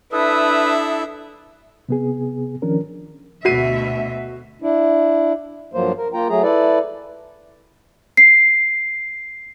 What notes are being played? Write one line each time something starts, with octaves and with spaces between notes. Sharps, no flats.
D4 E4 A4 B4 E5 D#6
C3 B3 G#4
D#3 F3 C#4 D4 A#4
D2 B2 F#4 E5 C7 D#7
D4 E4
G2 F3 F#3 A#3 C5
A#4
A#3 F4 G5 A#5
F#3 A3 G#4 A#5
E4 A4 B4 D5
C7